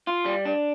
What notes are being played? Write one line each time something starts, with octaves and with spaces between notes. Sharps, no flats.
F4
G3
D4